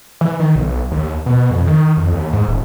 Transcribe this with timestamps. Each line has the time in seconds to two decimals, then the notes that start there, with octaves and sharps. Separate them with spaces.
0.21 E3
0.40 D#3
0.56 B1
0.92 D#2
1.26 B2
1.51 F2
1.67 D#3
1.97 F2
2.12 D#2
2.33 G#2
2.48 D#1